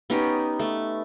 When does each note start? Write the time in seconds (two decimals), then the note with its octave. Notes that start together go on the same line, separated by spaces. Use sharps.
0.10 B3 C#4 D#4 G4
0.59 A3